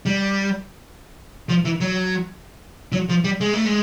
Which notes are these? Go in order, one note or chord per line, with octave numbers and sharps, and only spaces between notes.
G3
F3
E3
F#3
F#3
F3
G3
G#3
A3
G#3